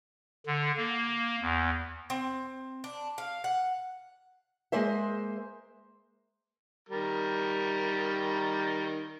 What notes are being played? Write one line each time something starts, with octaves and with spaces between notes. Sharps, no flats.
D3
A#3
E2
C4
D4
F5
F#5
G#3 A#3 C5 E5
D#3 G3 A#4